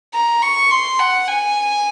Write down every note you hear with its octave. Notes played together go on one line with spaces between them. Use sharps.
A#5
C#6
C6
F#5
G#5